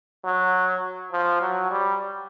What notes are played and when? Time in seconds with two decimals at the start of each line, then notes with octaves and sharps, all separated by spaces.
0.24 F#3
1.12 F3
1.41 F#3
1.71 G3